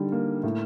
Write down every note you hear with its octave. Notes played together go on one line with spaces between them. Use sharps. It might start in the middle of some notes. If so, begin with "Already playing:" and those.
Already playing: D3 G3 D#4
A#3
A2